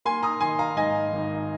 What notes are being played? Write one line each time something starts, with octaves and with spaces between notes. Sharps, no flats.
A#3 G#5 C6
A#5 D#6
D#3 G#5 C6
F5 A#5
G#2 D#5 G#5
G#1